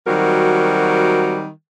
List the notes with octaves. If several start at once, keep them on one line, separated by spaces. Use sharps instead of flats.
D#3 F#3 G3 C4 F#4 A#4